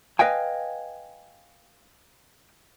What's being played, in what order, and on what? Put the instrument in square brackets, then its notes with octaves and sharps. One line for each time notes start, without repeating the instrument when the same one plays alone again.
[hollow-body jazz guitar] B4 D#5 F5 G5 G#5